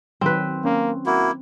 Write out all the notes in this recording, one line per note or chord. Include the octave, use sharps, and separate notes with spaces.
D#3 F#3 C4 B4
A#3 C#4
A#3 E4 F#4